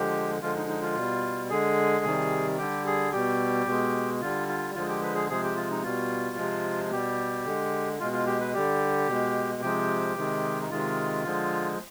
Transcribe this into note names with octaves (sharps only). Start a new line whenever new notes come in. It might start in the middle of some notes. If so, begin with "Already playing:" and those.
Already playing: D3 F3 G#3 G4
D3 F3 G#3 F4
D#4
D#4
F4
B2 G3
D3 G#3 G#4
C3 D#3 G3
D3 G3 G4
G#4
B2 G3 G4
B2 G#3
D3 G3 F4
F4
D3 F3 G#3 F4
G4
B4
G#4
C3 F3 G#3 G#4
G4
F4
D#4
B2 G3 F4
C3 F3 G#3
B2 G3 G4
D3 G#3
B2 G#3 F4
F4
G4
B4
D3 G3 G4
B2 G#3
C3 F3 G#3 G4
C3 D#3 G#3
D#4
C3 D#3 G#3 F4
D3 F3 G#3